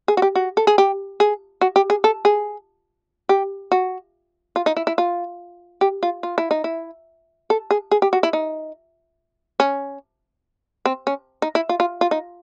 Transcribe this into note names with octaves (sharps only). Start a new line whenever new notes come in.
G#4
F#4
G4
F#4
A4
G#4
G4
G#4
F#4
G4
G#4
A4
G#4
G4
F#4
F4
D#4
E4
E4
F4
G4
F4
F4
E4
D#4
E4
A4
G#4
G#4
G4
F#4
E4
D#4
C#4
C4
C#4
D#4
E4
F4
F4
F4
D#4